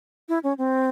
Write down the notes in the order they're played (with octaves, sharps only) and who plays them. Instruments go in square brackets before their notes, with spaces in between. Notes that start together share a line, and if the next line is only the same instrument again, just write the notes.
[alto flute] E4
C#4
C4